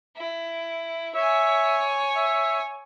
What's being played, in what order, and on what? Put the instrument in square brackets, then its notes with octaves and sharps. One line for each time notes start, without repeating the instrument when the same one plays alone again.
[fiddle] E4
[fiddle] C#5 G#5 [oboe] E5
[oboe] E5